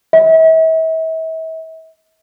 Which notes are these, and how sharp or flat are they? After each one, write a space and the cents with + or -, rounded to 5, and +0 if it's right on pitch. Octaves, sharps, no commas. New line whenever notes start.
E5 -40